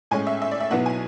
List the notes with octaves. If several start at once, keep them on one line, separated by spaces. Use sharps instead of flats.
A2 G#3 C#4 G#5
E5
E5
D5
E5
B1 B2 F#3 B3 E4 F#5
G#5